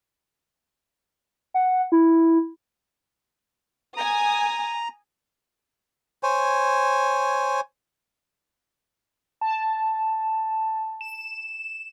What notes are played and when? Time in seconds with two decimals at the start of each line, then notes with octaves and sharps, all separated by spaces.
1.54 F#5
1.92 E4
3.97 G#5 A#5 D#6
6.23 C5 C#5 G#5
9.41 A5
11.01 E7